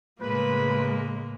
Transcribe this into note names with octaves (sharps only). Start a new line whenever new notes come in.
A2 C#3 G#3 A#3 B4